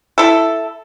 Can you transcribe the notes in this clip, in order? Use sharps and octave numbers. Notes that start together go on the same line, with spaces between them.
E4 A4